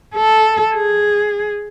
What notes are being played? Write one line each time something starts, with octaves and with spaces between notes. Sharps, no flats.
A4
G#4